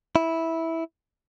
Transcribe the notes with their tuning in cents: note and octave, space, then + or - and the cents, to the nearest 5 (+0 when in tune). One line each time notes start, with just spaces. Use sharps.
E4 -10